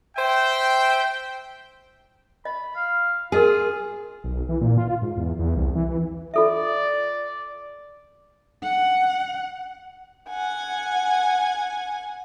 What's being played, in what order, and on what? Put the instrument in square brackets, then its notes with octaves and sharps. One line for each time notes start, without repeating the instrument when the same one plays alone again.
[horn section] C5 E5 G5
[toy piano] D#5 [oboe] B5
[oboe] F5
[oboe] F4 [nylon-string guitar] G#4 [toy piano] A#4 D#5 G#5
[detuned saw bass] B1
E3
A#2
F4
G#2
E2
E2
C2
E3
[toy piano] F4 A4 E5 [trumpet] D5
[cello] F#5
[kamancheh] F#5 G#5